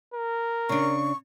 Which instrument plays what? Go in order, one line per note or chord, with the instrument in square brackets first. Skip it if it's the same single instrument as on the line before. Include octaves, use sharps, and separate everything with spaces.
[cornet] A#4
[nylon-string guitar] C#3 D4 [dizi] C#6